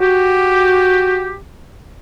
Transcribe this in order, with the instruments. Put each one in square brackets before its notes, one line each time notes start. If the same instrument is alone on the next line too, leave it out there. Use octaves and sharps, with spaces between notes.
[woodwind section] F#4 G4